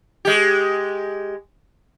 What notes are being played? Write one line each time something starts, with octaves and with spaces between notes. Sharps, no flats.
G#3 G4